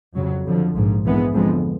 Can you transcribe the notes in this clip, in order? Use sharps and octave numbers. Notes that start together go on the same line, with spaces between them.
F2 C#3 F#3
F2 D3 F3
A#1 G#2 F3
A#1 G#2 E3 G#3 B3
F2 D3 F3 G#3 B3